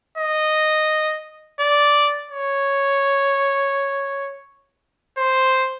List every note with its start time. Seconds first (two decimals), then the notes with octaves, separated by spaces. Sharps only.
0.18 D#5
1.60 D5
2.31 C#5
5.18 C5